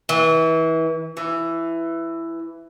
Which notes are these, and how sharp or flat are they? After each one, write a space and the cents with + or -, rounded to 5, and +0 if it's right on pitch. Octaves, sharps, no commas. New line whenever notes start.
E3 -30
E3 +10